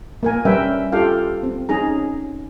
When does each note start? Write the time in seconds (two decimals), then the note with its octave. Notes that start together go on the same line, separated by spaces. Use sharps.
0.23 A#3 A#4 G#5
0.45 G3 C#4 A#4 B4 E5 G5
0.92 F4 G4 A4 F5 G5
1.43 C4
1.69 C#4 D#4 G#4 A#5